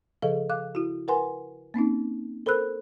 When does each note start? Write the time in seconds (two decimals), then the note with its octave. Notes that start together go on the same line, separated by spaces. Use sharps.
0.22 C#3 F3 G#4 A4 D#5 F5
0.50 F5 D6 F#6
0.75 E4 F#4
1.08 A#4 B4 F#5 G#5 C6
1.74 A#3 C4 C#4 D#4
2.46 A4 A#4 C5 B5 E6 F#6